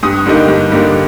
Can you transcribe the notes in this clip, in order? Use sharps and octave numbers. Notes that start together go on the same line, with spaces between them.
G2 D#6
D3 G3 A#3 D#4
G2
D3 G3 A#3 D#4